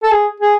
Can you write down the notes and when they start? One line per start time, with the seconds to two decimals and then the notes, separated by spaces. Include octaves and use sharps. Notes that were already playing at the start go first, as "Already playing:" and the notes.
0.03 A4
0.12 G#4
0.40 G#4